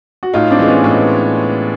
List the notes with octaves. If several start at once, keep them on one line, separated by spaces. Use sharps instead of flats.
F#4
A2 D#4 F4
C4 D4
E3 G#3
B3 C#4
A2